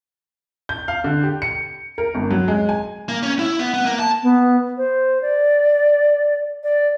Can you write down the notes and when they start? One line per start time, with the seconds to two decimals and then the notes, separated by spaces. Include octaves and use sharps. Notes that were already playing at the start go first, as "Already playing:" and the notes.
0.69 G6
0.88 F5
1.04 D3
1.24 G4
1.42 C#7
1.98 A#4
2.15 G1
2.31 F#3
2.48 G#3
2.69 G#5
3.09 A#3
3.23 C#4
3.39 E4
3.59 B3
3.74 B3
3.85 A#3
4.00 A5
4.23 B3
4.77 C5
5.22 D5
6.63 D5